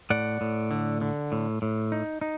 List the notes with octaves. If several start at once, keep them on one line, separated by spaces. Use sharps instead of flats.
A2 D5 F#5
A2
D3
D3
A2
A2
D#4
D#4